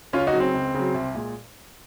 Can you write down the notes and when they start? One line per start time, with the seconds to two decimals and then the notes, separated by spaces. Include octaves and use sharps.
0.13 C#2 C#4 F4
0.27 D#4 F#4
0.33 C#3 F#3
0.40 C4
0.54 C#2
0.74 C#3 F#3
0.94 C2
1.15 A#2 G#3